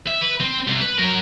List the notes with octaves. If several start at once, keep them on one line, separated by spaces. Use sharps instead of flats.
E5
B4
C4
C2
B4
F#3 A#4